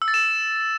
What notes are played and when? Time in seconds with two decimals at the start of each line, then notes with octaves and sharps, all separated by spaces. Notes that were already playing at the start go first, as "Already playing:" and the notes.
0.02 E6
0.08 A6
0.14 E7